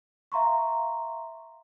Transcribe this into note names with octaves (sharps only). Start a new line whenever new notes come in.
E5 F5 A#5 C6 C#6